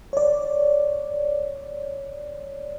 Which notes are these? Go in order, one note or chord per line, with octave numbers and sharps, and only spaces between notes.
C#5 D5